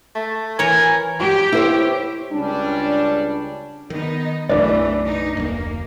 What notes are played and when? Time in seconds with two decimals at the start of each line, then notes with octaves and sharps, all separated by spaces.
0.15 A3
0.59 E3 A#4 C#5 G#5
1.19 G4
1.52 E4 C5 C#5
2.33 C#2 G3 C#4 D4
3.90 D#3 B3 D#4
4.49 B1 F#2 C#3 E3 A3 D4 B4 D5
5.05 D#4
5.37 F1 D2 A#3